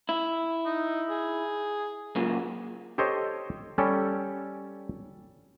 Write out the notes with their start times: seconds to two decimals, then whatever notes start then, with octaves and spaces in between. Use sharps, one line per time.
0.09 E4
0.65 D#4
1.10 G#4
2.16 F#2 A#2 C#3
2.98 G4 A4 C5 C#5 D#5
3.78 G3 C#4 G4 A4